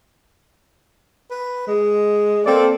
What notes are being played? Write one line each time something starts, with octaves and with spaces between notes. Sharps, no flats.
B4
G#3
A#3 C4 A4 D5